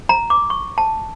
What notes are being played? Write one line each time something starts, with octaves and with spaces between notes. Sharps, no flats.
A#5
D6
C#6
A5